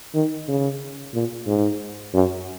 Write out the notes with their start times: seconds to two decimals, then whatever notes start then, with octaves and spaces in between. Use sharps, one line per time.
0.15 D#3
0.48 C#3
1.14 A#2
1.47 G#2
2.13 F#2